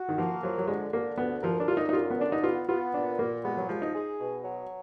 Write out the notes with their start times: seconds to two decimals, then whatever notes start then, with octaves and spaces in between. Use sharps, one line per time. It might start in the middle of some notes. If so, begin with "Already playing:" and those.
Already playing: F#4
0.09 D#3
0.17 F3 A#3
0.43 F3 F#3
0.58 F#3
0.67 D3 G#3
0.93 D3 A#3
1.18 D2 B3
1.43 F3 A#4
1.60 D4
1.68 D3 F4
1.77 D#4
1.89 D#4
1.93 F#2 F4
2.10 B3
2.19 D3 D4
2.32 D#4
2.43 B3 F4
2.69 B3 F4
2.94 A#2 D4
3.19 A#2 A#3
3.44 G#3 B3
3.57 F#3
3.69 F3 G#3
3.82 D#4
3.95 G#4
4.20 B2
4.44 F#3